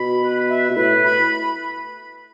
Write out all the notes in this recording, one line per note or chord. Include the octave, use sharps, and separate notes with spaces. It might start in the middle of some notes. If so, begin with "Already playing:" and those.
Already playing: B2 B5
B4
E5
B2
A2 B4
B5